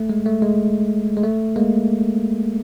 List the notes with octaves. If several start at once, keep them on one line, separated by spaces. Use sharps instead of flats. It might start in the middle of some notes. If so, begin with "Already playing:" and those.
Already playing: A3
G#3
A3
G#3
G#3
A3
G#3 A#3